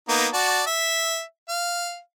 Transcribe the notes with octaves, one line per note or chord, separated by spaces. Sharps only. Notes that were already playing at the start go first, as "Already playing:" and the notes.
A#3 B3 D#4
F#4 D5 A5
E5
F5